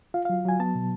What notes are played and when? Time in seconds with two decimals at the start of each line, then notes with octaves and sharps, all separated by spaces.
0.14 F4 F5
0.25 F#3 F5
0.45 F#3 G#5
0.60 B3 A5
0.75 B2